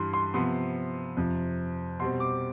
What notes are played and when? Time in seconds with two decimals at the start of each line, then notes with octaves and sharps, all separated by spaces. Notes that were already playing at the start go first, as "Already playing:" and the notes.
Already playing: G2 E3 G3 C6
0.13 C6
0.34 C3 F3 B3 C6
1.17 F2 C3 F3
1.99 B2 G3 C4 C6
2.20 D6